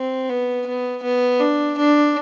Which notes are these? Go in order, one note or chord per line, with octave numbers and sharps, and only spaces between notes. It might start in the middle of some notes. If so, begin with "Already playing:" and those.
Already playing: C4
B3
B3
B3
D4
D4